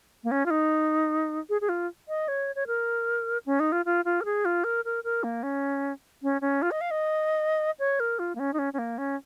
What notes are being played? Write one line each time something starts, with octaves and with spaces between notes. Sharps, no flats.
A#3
C#4
F4
D#4
G#4
G#4
F4
D#5
C#5
C#5
A#4
C#4
D#4
F4
F4
F4
A#4
G#4
F4
A#4
A#4
A#4
A#3
C#4
C#4
C#4
F4
D#5
F5
D#5
C#5
A#4
F4
A#3
C#4
D#4
C#4
C#4
A#3
C#4